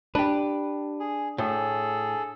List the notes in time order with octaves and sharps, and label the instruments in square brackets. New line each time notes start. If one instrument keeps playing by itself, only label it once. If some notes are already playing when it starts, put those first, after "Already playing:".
[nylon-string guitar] D4 [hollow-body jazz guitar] G4 B4
[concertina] G#4
[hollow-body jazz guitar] A2 [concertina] G#4 A4